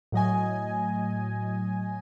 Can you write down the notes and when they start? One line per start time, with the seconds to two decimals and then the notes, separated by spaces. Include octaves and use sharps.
0.12 A2 F#3 D#5 G#5